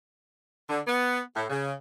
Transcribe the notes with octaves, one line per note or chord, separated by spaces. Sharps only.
D3
B3
A2
C#3